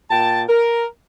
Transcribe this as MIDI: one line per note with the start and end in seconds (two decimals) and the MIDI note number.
0.10 0.43 46
0.10 0.43 79
0.10 0.43 81
0.49 0.86 70